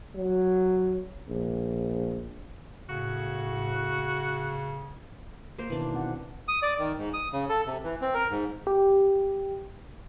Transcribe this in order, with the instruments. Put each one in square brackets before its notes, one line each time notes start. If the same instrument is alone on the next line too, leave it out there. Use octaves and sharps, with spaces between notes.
[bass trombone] F#3
A#1
[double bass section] A2 [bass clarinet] C#3 [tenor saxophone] F#4
[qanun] A#3 C5
[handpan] B2 D#3 [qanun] E3 D4
[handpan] C4 F#5
[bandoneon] D#6
D5
D#3
G#2
D#6
C#3
A4
C3
E3
C4
A#4
G#2
[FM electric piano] G4